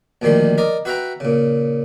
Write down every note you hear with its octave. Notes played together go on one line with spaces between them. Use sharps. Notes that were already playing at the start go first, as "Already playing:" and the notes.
D2 A#2 D#3 F3 G3 C6
A#4 D5 D#5
F#4 B4 E5 F#5 G5 A#5
A#2 C#3